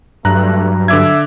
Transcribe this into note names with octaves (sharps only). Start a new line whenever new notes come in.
G2 F#3 A3 A#5 F#6
D3 E5 D6 G#6